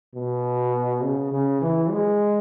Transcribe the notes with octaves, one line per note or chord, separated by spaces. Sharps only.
B2
C#3
C#3
E3
G#3